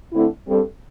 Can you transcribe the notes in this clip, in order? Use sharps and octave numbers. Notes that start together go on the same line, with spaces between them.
D3 A3 C4 E4
G2 G3 C4 A4